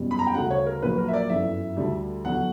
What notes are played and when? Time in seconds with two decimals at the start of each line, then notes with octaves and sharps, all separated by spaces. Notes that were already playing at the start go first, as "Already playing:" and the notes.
Already playing: F#1 E2 B2 G3
0.11 B5
0.19 A#5
0.27 G5
0.34 D2 C#3 G3 F#5
0.51 C#5
0.66 A#4
0.82 A#1 A#2 F#3 B4
0.98 A#4
1.08 E5
1.13 D5
1.30 G1 F#2 E3 E5
1.77 D2 D3 G3
2.24 E2 D3 F#3 F#5